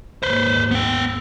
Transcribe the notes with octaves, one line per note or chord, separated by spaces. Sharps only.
D#2 G#2 B4 C5
B3 G5